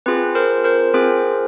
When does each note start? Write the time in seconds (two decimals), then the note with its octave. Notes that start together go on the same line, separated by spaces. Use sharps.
0.06 C4 F4 G#4 B4
0.35 A#4 C5
0.64 A#4 C5
0.94 C4 F4 G#4